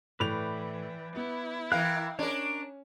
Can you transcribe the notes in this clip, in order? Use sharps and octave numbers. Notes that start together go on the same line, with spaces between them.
A2 E3 B4 D5 G5 F7
B3 E4
E3 A#4 F5 G5 F#6
C#4 D4 A#4 C#5